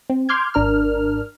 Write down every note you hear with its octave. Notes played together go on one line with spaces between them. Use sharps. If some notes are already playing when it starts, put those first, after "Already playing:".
C4
C6 D6 F6 G6 G#6
G#1 D4 A#4 F6